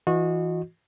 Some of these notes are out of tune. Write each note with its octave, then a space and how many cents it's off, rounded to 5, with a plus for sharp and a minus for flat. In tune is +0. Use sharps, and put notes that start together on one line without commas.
E3 +0 F#4 -30 D#5 -10